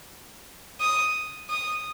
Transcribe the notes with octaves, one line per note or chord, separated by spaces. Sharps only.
D#6
D#6